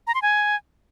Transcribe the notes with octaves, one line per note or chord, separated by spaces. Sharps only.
A#5
C6
G#5